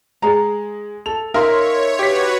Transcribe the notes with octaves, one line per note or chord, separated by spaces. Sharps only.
G#3 G#4 A#5
A4 F7
D#4 A#4 C#5 E5 F5 C6
F#4 G4 B4 C#5 B6